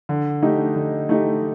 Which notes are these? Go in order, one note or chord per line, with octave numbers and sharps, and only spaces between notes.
D3
A3 D#4 G4
D3
A3 D#4 G4